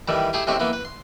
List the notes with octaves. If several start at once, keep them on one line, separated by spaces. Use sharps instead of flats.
D#3 E3 G3 A3
A3 E4 G4 G#4
A1 C3 G#3 A3 G4 C#6
E3 A#3 B3
B4
C6